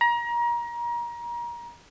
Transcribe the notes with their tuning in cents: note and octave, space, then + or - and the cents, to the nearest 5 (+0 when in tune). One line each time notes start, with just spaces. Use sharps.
A#5 +30